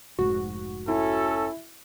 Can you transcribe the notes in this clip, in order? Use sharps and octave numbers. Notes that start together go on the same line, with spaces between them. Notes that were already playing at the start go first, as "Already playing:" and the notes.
F1 G#2 F#4
C#4 E4 A4